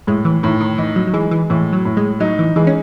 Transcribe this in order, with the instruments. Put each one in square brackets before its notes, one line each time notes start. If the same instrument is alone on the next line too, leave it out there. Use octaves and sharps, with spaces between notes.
[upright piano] A2 [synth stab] G#3
[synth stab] E3
[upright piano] A2 [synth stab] D#3
[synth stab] D#3
[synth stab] E3 [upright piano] D#4
[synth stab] F#3
F#3
[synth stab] E3 [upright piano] G#3
[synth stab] E3
[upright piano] A2 [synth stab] E3
[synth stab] F#3
[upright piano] A2
[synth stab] G#3
[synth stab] F#3 [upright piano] D#4
[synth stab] E3
[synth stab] E3 [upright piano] G#3
[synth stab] C#4